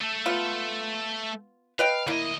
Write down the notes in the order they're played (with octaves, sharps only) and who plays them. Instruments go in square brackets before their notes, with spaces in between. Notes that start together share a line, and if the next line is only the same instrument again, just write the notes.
[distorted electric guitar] A3 A4
[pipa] B3 F4
[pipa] B4 D#5 G5 [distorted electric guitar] F5
[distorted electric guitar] D2 D#5 [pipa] A#3 E4